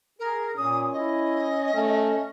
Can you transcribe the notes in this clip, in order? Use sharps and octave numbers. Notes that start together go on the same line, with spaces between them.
G#4 A#4
A#2 C#4 D#6
E4 D#5
A3 C#4